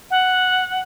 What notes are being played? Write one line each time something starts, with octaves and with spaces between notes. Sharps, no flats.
F#5